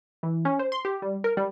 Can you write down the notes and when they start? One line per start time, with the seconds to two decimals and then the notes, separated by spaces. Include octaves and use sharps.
0.23 E3
0.45 C#4
0.59 C5
0.72 C6
0.85 G4
1.02 G3
1.24 A#4
1.37 G3